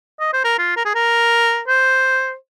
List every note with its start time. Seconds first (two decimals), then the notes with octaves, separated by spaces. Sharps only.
0.20 D#5
0.33 C5
0.45 A#4
0.58 F4
0.77 A#4
0.85 G#4
0.95 A#4
1.68 C5